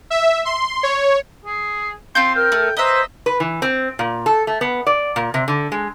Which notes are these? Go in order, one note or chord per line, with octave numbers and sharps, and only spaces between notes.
E5
C6
C#5
G#4
C4 F4 C6 G6
A#4 G5 F6
A3
B4 C5 D#5 E5 A#5 E6
B4
E3
C4
A#2
A4
A3
B3
D5
A#2
C3
D3
G#3